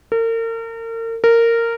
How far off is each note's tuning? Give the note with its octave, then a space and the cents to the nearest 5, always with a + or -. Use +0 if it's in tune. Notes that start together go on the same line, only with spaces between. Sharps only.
A#4 -40
A#4 -15